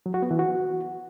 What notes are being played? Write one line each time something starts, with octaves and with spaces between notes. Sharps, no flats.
F#3
F#4
B3
E3
F#4